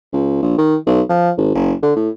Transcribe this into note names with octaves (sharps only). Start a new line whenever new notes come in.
C#2
A#1
D#3
B1
F3
G#1
F#1
D3
A2